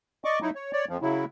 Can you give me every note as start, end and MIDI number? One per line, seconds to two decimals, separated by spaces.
0.24 0.39 74
0.24 0.39 75
0.24 0.39 85
0.24 0.39 86
0.42 0.50 54
0.42 0.50 63
0.42 0.50 64
0.55 0.73 73
0.73 0.85 73
0.73 0.85 74
0.89 0.98 41
0.89 0.98 53
1.02 1.25 49
1.02 1.25 54
1.02 1.25 64